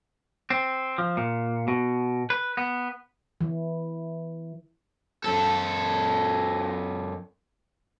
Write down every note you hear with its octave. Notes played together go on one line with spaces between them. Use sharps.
C4
F3
A#2
B2
B4
B3
E3
F#2 A4